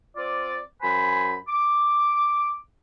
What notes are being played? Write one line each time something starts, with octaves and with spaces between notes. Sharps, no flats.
C4 F4 D5
F#2 C5 G#5 B5
D6